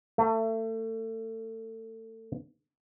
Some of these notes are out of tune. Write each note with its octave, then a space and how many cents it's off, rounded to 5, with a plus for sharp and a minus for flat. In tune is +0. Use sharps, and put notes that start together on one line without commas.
A3 +30